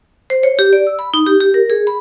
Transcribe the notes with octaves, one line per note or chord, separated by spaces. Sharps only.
C5
C#5
G4
D5
E6
B5
D#4
G4
G4
A#4
G#4
B5